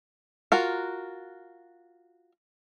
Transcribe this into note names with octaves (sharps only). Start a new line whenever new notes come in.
F4 F#4 A#4